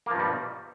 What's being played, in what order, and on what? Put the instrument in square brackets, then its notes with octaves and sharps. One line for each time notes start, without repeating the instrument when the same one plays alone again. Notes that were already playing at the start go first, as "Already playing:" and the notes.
[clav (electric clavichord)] A#3
F3
G2
G3
B2